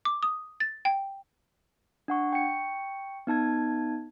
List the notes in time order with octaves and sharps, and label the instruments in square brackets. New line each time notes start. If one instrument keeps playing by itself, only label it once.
[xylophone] D6
D#6
A6
G5
[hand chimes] D4 F#5 C#6
G5 C#6 C#7
B3 D#4 A5 G#6